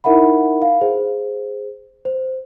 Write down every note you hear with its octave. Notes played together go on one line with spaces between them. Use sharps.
D#4 E4 A#4 E5 F#5 B5
F5
G#4 C5
C5